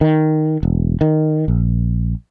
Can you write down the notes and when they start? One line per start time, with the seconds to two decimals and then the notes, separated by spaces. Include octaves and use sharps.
0.01 D#3
0.63 E1
1.01 D#3
1.48 A#1